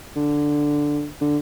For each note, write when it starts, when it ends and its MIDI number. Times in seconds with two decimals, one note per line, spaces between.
0.16 1.06 50
1.21 1.38 50